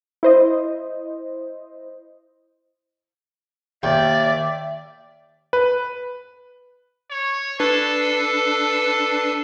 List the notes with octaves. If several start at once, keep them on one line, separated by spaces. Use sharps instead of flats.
E4 C5 D#5
D#2 D5 E5 G5
B4
C#5
D4 A4 B4 C7